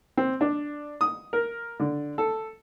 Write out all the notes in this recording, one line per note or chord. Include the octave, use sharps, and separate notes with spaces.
C4
D4
D#6
A#4
D3
A4